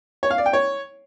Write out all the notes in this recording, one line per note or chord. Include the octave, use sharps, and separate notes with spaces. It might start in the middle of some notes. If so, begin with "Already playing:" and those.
C#5
F5
D5
G5
C#5